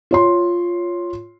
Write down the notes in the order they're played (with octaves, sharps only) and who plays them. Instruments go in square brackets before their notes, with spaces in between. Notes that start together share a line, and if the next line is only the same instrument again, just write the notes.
[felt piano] F4 C#5 C6